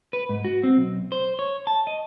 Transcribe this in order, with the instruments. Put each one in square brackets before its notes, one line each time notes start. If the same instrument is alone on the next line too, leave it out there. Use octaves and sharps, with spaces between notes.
[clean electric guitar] B4
G#2
F#4
C4
B1
C5
C#5
A5
D#5